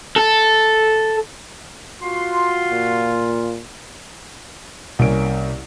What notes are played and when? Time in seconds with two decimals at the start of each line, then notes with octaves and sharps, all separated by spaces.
0.16 A4
2.02 F4 F#4 C6
2.71 A#2
4.99 C2 A#3 C#4 D7